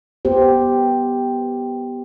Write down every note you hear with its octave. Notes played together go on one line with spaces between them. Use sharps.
B3 G4 C5